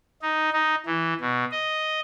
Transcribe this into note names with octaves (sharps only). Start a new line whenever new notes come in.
D#4
D#4
E3
B2
D#5